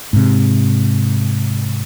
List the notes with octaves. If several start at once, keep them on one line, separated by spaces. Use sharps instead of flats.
G#2 C3